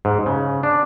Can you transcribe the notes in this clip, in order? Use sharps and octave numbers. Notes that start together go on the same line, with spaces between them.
G#2
C#3
D4